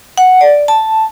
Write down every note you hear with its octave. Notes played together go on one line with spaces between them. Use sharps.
F#5
D5
A5